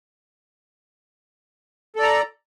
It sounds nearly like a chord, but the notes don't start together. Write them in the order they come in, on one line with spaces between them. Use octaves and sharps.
A4 D5 A#5